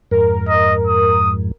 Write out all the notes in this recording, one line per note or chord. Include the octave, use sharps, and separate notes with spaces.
F2 G#2 A#4
D#5
D#6